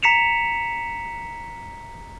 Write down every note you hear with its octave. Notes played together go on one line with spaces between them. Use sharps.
A#5 B6 C#7 E7 F7